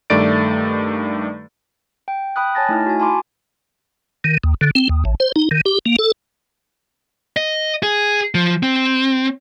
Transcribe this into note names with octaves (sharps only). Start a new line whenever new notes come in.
G2 D#3 A3 D5 A6 D7
G5
G5 B5 D#6 F#6
C#5 G#5 A5 A6 A#6
A3 D#4 E4 F6
F#4 G#5
G#5 A5 B5 C6 D6
D#3
D#2
D3
C4
D#2
A1
C5
D#4
D#3
G4
A#3
A4
D#5
G#4
F3
C4